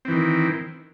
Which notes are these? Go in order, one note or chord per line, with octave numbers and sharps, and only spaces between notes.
D#3 E3 C4